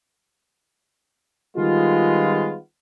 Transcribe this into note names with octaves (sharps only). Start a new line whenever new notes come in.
D#3 G3 G#3 B3 F4